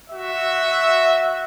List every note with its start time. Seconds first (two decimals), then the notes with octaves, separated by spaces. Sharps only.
0.11 F#4 E5